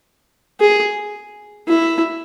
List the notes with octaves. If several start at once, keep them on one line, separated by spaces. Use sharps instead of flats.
G#4
E4